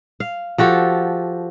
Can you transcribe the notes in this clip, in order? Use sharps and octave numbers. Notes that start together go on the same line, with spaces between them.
F5
F3 F#4 G4 A4